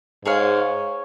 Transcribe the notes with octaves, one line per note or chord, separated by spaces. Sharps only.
G#2 G#4 C#5 F5